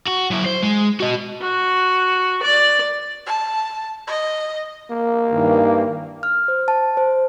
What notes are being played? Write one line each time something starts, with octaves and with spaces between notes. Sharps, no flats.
F#4
F#2 E4
C5
G#3
F#4 D#5
F#4
D5
A5
D#5
A#3
G2 D#3 E3
F6
C5
A5
C5